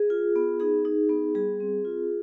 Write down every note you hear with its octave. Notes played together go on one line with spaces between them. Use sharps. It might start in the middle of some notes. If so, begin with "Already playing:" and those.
Already playing: G#4
F4
B3
D#4 G#4
D#4
B3
G3 G#4
C4
F4